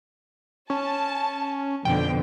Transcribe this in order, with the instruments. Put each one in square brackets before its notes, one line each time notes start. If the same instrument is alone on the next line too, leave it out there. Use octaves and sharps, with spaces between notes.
[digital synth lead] C#4 [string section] A5
[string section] F2 B2 D3 [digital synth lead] G5